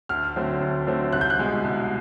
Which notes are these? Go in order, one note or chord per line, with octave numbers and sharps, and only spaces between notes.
D2 F6
D3 F#3 A3 C4
D2
D3 F#3 A3 C4
C2 F#6
G6
F#6
B2 G#3
C2